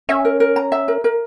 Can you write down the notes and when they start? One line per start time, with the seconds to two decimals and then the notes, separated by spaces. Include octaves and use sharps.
0.09 C#4 E5
0.25 A#4
0.40 A#4
0.56 A#5
0.72 E5
0.88 A#4
1.04 A#4